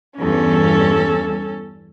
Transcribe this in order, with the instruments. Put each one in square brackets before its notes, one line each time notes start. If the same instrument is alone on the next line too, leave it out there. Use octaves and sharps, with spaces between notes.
[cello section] E2 G2 [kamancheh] C#4 A4